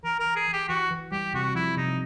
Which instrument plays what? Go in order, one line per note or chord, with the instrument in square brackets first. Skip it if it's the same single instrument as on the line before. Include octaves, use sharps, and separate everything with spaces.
[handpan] E3 [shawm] A#4
[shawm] A#4
[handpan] E3
[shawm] G#4
[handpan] E3
[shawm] G4
[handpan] E3 [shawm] F#4
[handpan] E3
[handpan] G3 [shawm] G4
[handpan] C3 [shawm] F#4
[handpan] F3 [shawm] E4
[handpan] C3 [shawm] D#4